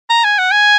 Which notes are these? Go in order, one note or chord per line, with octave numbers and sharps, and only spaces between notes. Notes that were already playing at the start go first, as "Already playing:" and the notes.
A#5
G#5
F#5
G#5